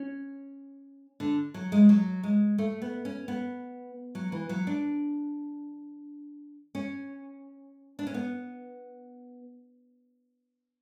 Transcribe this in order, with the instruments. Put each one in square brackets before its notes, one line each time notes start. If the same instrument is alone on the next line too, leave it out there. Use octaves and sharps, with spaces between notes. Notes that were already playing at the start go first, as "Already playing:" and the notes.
Already playing: [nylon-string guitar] C#4
D3
F#3
G#3
F#3
G#3
A3
B3
C#4
B3
F#3
E3
F#3
D4
C#4
D4
C#4
B3